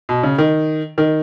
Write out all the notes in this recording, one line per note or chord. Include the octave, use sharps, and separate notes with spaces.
B2
C#3
D#3
D#3